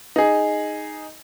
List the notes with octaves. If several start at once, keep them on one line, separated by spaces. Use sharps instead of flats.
D#4 G#4